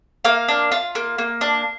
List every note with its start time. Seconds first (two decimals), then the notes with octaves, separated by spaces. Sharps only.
0.25 A#3 F5
0.48 D4
0.72 F4
0.95 A#3
1.18 A#3
1.41 D4